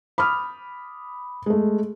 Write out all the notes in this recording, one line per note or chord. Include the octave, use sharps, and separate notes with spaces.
B5 D6 D#6 F6
G#3 A3